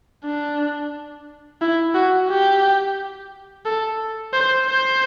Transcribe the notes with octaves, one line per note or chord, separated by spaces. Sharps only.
D4
E4
F#4
G4
A4
C5
C5